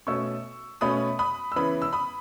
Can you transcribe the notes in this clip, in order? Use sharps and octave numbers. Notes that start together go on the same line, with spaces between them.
B2 A3 C#4 C#6 E6
B2 A3 C#4 B5 D#6
B5 D#6
E6
C#3 E3 B3 B5 D#6
E6
B5 D#6